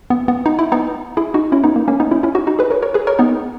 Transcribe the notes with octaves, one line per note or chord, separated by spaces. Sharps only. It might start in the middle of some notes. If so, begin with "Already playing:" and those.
B3
B3
D#4
E4
B3 D#4
E4 G#4
D#4 F#4
C#4 E4
B3 D#4
A#3
A#3 C#4
B3 D#4
C#4 E4
C#4 E4
D#4 F#4
D#4 F#4
G#4 B4
A#4 C#5
A#4 C#5
G#4 B4
A#4 C#5
B3 D#4